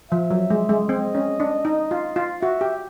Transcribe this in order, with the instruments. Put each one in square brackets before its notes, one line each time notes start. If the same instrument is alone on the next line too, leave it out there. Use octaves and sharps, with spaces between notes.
[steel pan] F3 [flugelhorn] E5
[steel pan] F#3
G#3
G#3
[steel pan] C4 [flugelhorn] D#5
[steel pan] C#4
D4
D#4
F4
F4
[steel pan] F#4 [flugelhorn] E5
[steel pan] G4